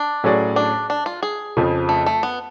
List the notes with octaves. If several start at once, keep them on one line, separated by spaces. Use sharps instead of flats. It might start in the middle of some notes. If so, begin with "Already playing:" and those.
Already playing: D4
A2 F#3 C#4 G#4 D5
D4
D4
F4
G#4
F2 C#3 F3
A3
A3
B3